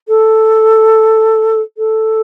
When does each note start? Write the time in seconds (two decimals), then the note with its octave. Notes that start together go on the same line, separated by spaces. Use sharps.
0.08 A4
1.77 A4